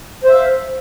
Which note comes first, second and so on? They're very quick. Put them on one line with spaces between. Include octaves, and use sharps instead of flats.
C5 E5 F5